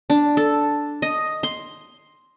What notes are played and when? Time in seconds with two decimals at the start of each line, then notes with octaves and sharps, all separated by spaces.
0.10 D4
0.37 A4
1.02 D#5
1.43 C6